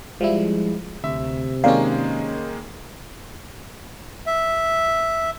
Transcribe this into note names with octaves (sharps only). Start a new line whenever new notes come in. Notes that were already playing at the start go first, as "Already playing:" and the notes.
F3 G3 G#3 E4
D2 C3 E5
D#3 G#3 A#3 C4 C#4 A#4 D5 F5
E5